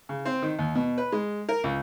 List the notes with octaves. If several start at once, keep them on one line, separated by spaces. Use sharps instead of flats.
C#3
C4
D#3
D#2
B2
B4
G#3
A#4
C#2